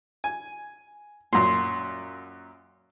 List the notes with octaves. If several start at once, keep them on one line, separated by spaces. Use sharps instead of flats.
G#5
F#2 A#2 C6